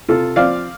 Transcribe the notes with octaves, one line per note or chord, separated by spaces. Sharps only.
C3 F4 A4
F3 C4 D5 F5